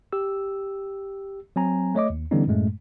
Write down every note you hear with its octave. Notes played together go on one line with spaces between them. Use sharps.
G4 E6
F#3 C4 G#5 A#5
A3 C#5 D#5 D6
D#2
D3 E3 G3 B3 C#4 D#4
F#2 A2 G#3 A3